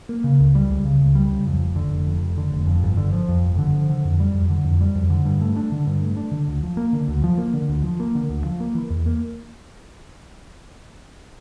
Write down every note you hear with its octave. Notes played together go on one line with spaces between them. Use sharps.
A#3
C#3
C#2
G3
C#2
C#3
C#2
G3
C#2
F2
F1
D3
F1
F2
F1
D3
F1
F2
G1
D3
F3
F2
G1
D3
F3
D3
F2
G3
F2
D3
F2
G3
F2
D3
G2
A3
D4
D3
G2
A3
D4
D3
D2
F3
A#3
D3
D2
F3
A#3
D3
D2
F3
A#3
D3
D2
F3
A#3
E3
E2
A#3